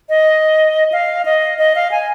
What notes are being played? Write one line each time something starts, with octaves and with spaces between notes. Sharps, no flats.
D#5
F5
D#5
D#5
F5
G#5